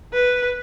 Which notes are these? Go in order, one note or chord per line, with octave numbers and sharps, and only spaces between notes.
B4